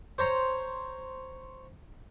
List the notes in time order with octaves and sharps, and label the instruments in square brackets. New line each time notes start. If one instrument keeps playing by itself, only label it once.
[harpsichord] C5 C#5 A#5